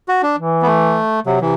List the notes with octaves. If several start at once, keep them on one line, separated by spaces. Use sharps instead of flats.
F#4
D4
E3
B3
A3
C3 F#3
C3 E3